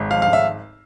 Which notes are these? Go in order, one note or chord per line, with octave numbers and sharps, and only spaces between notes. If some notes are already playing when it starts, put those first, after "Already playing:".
Already playing: G#1 G#2
F3 F5
F5
G#1
E5